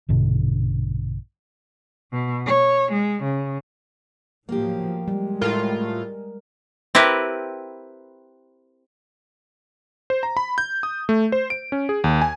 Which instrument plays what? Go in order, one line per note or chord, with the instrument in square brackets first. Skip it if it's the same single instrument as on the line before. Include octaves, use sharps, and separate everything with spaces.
[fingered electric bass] A#1 G2 B2 D3
[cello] B2
C#5
G#3
C#3
[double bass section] A2 F3 F#3 [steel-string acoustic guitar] A#3 G4
[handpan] G3 [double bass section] G#3
[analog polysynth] A2 F4 [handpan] A#4
[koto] C4 E4 G4 A#4 B4
[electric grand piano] C5
A#5
B5
G6
D#6
A3
C5
D7
C#4
G#4
D#2
G#5